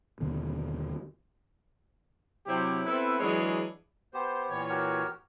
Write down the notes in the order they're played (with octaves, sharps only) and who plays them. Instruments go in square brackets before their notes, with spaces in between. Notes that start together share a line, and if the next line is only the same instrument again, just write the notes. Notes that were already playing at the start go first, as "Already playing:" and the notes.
[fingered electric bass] D#2 B2 D3 D#3
[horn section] C3 F#3 C4 E4 G4
B3 C4 E4 A4 B4 E5
E3 F#3 G#3 D4 G#4 C#5
[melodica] B3 G4 [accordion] C5
[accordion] A#2 E3 C#5
[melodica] F#4 G4 A#4